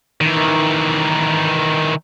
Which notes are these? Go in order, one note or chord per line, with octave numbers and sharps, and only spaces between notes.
D#3 E3